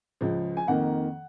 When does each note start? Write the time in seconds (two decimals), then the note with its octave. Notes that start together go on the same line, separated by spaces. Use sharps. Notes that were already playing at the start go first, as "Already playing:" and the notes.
0.21 C#2 C#3 F3
0.57 G#5
0.67 F2 D#3 A#3 F#5